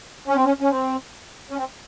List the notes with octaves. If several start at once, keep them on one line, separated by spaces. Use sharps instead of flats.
C#4
C4
C#4
C#4
C4
C#4
C4